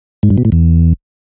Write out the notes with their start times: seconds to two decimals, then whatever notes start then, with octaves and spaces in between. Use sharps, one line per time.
0.23 G#2
0.30 G2
0.38 B2
0.45 A2
0.52 E2